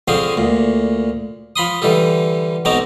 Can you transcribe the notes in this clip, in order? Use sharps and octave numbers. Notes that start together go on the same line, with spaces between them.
D3 F3 C4 C#4 G#4 C5
D2 A#2
F3 B5 C6 D#6
D3 E3 G3 G4 A4
B1 F#3 C4 D#4 A#5 D6